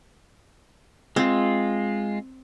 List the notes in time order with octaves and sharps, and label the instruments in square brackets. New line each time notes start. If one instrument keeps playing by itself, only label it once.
[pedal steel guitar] G#3 F4 [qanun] C4